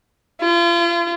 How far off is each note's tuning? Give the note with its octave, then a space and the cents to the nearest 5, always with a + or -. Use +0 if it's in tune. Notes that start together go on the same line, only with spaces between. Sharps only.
F4 -35